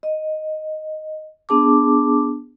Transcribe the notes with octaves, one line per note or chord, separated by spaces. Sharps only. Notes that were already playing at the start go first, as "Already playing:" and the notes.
D#5
B3 D4 G#4 A5 D6